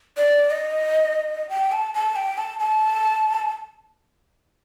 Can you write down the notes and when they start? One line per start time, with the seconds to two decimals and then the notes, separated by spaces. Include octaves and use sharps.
0.17 D5
0.51 D#5
1.49 G5
1.72 A5
1.94 A5
2.16 G5
2.38 A5
2.59 A5